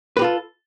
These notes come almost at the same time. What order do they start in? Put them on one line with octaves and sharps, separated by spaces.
B4 G4 F4 A4